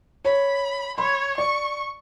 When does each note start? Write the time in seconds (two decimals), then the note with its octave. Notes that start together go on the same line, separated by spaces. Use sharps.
0.25 C#5 B5
0.98 C#5 B5 C6
1.38 D5 C#6